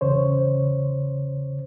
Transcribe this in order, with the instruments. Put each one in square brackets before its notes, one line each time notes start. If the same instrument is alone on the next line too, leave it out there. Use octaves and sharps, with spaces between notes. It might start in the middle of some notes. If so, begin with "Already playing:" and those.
[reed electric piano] E2 C#3 C5 C#5